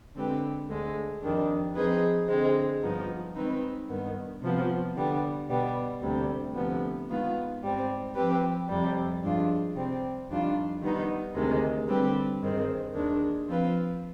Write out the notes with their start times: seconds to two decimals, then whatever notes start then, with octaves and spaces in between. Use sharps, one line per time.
0.15 D3 G#3 C4 G4 B4
0.69 D2 D3 G#3
1.22 F2 D#3 G3 D4
1.75 F3 C4 D#4 G#4 B4
2.28 D3 G#3 C4
2.82 G2 F3 B3 D#4
3.36 D#3 G#3 C4 D#4 B4
3.89 G2 D#3 B3
4.42 C3 F3 B3
4.95 D3 G3 B3
5.49 B2 G3 B3
6.02 D2 C3 G3
6.55 D2 C3 F3 B3
7.09 D#3 G#3 B3 F4 B4
7.62 G#2 G3 C4
8.15 F3 C4 G4 B4
8.69 F2 C3 G3
9.22 G2 F3 G#3 D4 F4
9.75 C3 G3 C4
10.29 F2 D#3 G3 D4 F4
10.82 D#3 G3 B3 D#4
11.35 D2 C3 D#3 G#3
11.88 D3 G3 C4 G4 B4
12.42 G2 D#3 G#3 C4
12.94 D#2 D#3 G#3 D4
13.47 F3 C4 F4 B4